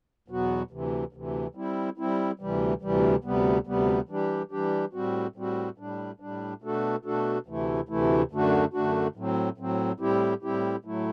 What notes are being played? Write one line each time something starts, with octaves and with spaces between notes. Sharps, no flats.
E2 B2 F#3 B3 F#4
D2 C3 E3
D2 C3 E3
G3 C4 E4
G3 C4 E4
D2 C3 E3 G3
D2 C3 E3 G3
D2 C3 G3 B3
D2 C3 G3 B3
E3 G3 D4 G4
E3 G3 D4 G4
A2 G3 C4 F#4
A2 G3 C4 F#4
A2 G3 D4
A2 G3 D4
B2 A3 D4 F#4 A4
B2 A3 D4 F#4 A4
D2 C3 E3 A3 E4
D2 C3 E3 A3 E4
F#2 D3 A3 D4 F#4
F#2 D3 A3 D4 F#4
A2 F#3 C4
A2 F#3 C4
A2 G3 C4 E4 G4
A2 G3 C4 E4 G4
A2 F#3 A3 E4